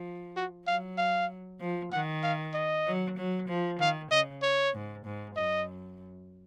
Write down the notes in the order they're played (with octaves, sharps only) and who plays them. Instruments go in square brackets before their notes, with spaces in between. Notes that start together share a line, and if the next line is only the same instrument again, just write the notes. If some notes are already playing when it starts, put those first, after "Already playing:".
Already playing: [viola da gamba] F3
[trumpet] F#4
[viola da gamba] F#3 [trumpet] F5
[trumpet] F5
[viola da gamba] F3
[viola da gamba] D#3 [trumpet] F#5
[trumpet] F5
D#5
[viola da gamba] F#3
F#3
F3
[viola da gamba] D#3 [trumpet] F5
[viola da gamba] C#3 [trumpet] D#5
[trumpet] C#5
[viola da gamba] G#2
G#2
[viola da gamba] F#2 [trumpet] D#5